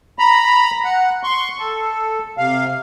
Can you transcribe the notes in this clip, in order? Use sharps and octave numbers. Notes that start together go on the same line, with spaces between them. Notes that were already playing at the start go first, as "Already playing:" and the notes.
A#5 B5
F#5
C6 C#6
A4
C3 F5